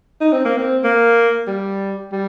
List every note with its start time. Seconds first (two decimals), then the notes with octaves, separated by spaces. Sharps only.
0.21 D#4
0.32 C4
0.45 A#3
0.57 C4
0.84 A#3
1.47 G3
2.12 G3